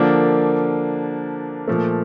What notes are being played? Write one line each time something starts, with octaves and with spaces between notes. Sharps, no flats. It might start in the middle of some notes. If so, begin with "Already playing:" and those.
Already playing: D3 F3 A#3 D4
A#2 F3 A3